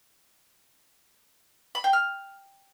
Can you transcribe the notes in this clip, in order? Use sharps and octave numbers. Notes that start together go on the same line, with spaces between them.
B5
G5
F6